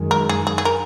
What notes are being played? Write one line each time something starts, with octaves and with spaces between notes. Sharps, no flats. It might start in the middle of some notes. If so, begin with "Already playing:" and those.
Already playing: F#2 D#3 G#3
A#4
G#4
G#4
G#4
A#4